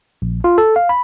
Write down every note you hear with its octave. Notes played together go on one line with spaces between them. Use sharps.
A#1
F4
A4
F5
B5